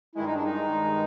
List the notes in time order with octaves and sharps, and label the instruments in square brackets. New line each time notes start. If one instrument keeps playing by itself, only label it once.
[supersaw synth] G2 D#3 G#3 [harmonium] E4
[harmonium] D#4
D4
D#4